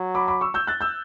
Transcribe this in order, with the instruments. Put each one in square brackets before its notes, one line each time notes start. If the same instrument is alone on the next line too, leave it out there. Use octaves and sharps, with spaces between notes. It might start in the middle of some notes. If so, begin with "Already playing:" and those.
Already playing: [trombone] F#3
[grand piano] B5 D6
B5 D6
C#6 E6
E6 G6
F#6 A6
E6 G6